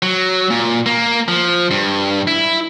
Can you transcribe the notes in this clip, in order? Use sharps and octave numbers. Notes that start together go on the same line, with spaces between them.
F#3
A#2
A#3
F3
G2
E4